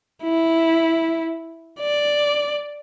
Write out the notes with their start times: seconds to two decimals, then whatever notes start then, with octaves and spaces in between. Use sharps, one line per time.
0.23 E4
1.80 D5